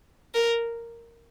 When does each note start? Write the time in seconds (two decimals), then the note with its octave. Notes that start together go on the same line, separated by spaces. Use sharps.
0.35 A#4